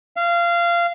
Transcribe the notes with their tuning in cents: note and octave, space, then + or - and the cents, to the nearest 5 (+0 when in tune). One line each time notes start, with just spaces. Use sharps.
F5 -20